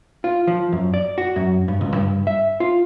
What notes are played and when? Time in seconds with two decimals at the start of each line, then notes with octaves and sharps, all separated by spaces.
0.24 F4
0.47 F3
0.73 F#2
0.94 D5
1.18 F#4
1.36 F#2
1.68 G2
1.81 C#2
1.94 G2
2.27 E5
2.60 F4